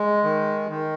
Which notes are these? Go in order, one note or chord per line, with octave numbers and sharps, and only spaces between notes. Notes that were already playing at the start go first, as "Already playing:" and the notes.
Already playing: G#3
D#3
D#3